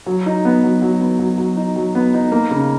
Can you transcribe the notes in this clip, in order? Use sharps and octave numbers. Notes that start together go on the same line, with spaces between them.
F#3
D#4
B3
F#3
F#3
B3
F#3
F#3
D#4
F#3
B3
D#4
A#3
C#3